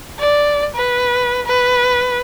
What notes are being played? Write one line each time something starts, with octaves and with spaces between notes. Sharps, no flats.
D5
B4
B4